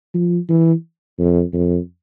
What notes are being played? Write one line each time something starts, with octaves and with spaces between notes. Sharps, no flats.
F3
E3
F2
F2